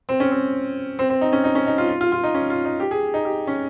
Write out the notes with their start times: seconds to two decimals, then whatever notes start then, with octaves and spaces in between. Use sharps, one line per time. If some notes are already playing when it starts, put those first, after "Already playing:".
0.09 C4
0.20 C#4
0.31 C4
0.99 C4
1.10 C4
1.21 D#4
1.33 C#4
1.44 D#4
1.55 C#4
1.67 D#4
1.78 F4
1.89 F4
2.01 F4
2.12 F4
2.23 D#4
2.34 C#4
2.50 F4
2.65 D#4
2.80 G4
2.91 G#4
3.14 D#4
3.25 G4
3.47 C#4